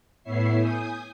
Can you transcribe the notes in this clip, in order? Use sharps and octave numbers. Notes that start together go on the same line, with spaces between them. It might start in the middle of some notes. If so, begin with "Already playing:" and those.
A2 B3 E4 C#5 E5 C7
G#5 D#6 G6